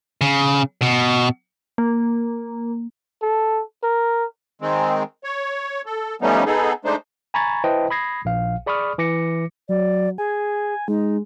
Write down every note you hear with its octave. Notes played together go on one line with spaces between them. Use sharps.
C#3
B2
A#3
A4
A#4
D#3 G#3 C4
C#5
A4
F3 G3 A3 B3 C#4 D#4
B3 D#4 G#4 A4
G#3 A3 D4 D#4 C5
G#5 A#5 B5 C#6 G#6 A6
E4 B4 C5 D#5 G5 A5
B5 D#6 G#6 A#6 C7
A#1 F5
G#4 D5 B5 C#6 D#6 F6
E3 D6 A#6 C#7
F#3 D5
G#4 G#5
G#3 D#4